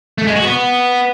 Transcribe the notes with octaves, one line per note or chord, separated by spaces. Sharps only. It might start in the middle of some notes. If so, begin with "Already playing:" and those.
A3
G#3
F#4
B3